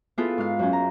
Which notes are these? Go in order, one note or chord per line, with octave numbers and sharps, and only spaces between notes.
B3 E4 F4 G#4 A4
G#2 F5
F#2 C#4
A#5